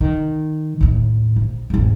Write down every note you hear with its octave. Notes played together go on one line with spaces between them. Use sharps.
D#3
D#2 A2
A#1
G#1 E2